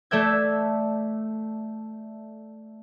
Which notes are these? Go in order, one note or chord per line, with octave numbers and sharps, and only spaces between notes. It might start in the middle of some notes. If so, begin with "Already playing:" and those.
A3 A4 D5 E5 G6 G#6